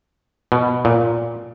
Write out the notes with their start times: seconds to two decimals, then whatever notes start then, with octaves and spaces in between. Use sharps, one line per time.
0.52 B2
0.85 A#2